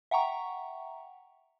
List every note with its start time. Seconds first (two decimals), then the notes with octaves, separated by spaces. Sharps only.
0.11 E5 F#5 G5 A#5 C#6